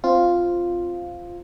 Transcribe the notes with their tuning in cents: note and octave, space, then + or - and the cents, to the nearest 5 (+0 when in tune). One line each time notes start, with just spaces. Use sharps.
C4 +0 F4 +0